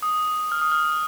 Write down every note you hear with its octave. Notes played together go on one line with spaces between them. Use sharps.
D#6
F6
D#6
F6